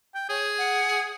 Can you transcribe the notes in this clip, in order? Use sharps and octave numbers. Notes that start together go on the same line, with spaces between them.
G5
G#4 C#5
F#5